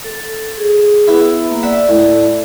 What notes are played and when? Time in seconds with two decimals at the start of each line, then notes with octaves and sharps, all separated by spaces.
0.04 A4
0.57 G#4
1.08 B3 E4
1.46 A#3 E5
1.63 D5 E5 F#5
1.89 A2